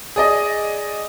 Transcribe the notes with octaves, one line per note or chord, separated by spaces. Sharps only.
G#4 D5 D#5